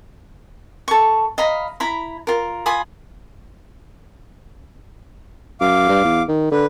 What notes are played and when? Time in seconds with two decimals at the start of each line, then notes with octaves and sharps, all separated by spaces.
0.88 A4 C#6
1.38 D#5 F5 A#5 B5
1.80 E4 A#5 B5
2.27 F4 A#4
2.66 F4 G#5 B5 D#6
5.61 F#2 F5 D6
5.89 G2
6.04 E2
6.28 D#3
6.52 D3 B4